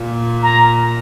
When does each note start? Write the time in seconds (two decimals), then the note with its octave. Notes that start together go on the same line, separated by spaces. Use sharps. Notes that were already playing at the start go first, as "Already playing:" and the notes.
Already playing: A#2
0.42 A#5